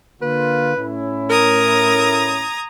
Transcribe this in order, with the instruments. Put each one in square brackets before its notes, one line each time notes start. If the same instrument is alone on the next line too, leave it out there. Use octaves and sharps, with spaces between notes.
[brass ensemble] D3 A#3 F4 [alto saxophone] B4
[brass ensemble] A2 C#4 E4
[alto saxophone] A#4 [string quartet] A#5 D#6 G#6